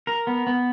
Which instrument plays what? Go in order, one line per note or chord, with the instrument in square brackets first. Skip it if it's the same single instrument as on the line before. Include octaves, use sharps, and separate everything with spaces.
[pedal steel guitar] A#4
B3
B3